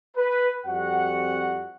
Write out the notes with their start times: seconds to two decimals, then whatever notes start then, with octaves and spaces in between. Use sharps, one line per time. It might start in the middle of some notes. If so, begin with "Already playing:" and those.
0.16 B4
0.65 F2 G3 C4 F#4 F#5